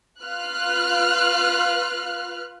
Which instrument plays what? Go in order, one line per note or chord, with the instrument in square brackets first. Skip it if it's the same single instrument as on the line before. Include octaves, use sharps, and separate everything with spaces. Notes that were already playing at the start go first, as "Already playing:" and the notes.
[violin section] F4 B4 F6 F#6